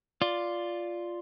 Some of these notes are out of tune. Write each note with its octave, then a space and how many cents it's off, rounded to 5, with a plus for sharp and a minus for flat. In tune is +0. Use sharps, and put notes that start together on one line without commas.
F4 +0 D5 +0